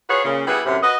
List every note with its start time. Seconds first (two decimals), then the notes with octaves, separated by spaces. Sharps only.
0.09 F4 F#4 G#4 B4 C#5
0.24 A#2 C#3
0.47 G3 B3 E4 F#4 G#4
0.65 F#2 A2 C3
0.83 F#4 B4 D#5